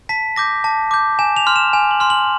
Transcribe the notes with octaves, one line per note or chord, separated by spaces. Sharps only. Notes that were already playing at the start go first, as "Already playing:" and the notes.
A5 B6
D6 G6 A#6
A5
D6 G6
G#5 E7
F7
C6 F6
E7
G#5
F#7
C6 F6
F#7